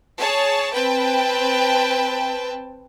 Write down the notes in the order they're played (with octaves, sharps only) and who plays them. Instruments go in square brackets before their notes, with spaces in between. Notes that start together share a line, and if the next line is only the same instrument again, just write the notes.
[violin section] G#4 C#5 A5
C4 B4 G5 A5